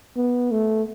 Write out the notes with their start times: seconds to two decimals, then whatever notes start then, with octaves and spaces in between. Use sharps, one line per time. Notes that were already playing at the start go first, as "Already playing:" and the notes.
0.16 B3
0.51 A3